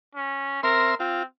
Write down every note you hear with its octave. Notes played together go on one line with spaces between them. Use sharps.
C#4
C4 A#4 E5 C6
C4 F4